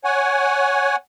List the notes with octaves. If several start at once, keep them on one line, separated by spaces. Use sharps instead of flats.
C#5 F#5 G#5